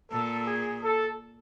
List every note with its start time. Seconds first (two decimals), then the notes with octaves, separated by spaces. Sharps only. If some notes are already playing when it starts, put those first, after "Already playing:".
0.11 A#2 A4
0.47 G#4
0.82 A4